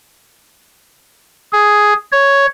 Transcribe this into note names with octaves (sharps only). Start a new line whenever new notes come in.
G#4
C#5